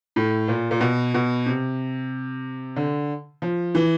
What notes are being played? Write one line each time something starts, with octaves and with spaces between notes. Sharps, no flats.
A2
A#2
A#2
B2
B2
C3
D3
F3
E3